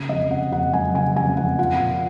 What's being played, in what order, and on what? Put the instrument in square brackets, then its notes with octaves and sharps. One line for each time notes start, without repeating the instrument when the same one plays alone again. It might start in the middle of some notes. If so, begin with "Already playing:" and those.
Already playing: [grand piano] C#3
[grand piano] F2 [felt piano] D#5
[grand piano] F2 [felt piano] F#5
[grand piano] F2 [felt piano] F#5
[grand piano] F#3 [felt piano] G#5
[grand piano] C#3 [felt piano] G#5
[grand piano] F2 [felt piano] G#5
[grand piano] F2 [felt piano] F#5
[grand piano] F4 [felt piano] F#5
[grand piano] A#2